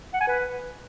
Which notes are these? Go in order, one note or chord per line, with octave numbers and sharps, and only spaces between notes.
F#5
G#5
B4